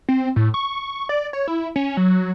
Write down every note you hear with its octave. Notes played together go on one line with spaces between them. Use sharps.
C4
A2
C#6
D5
C#5
E4
C#4
F#3